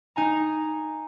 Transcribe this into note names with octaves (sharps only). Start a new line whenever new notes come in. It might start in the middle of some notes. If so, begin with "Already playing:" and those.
D#4 G#5 A#5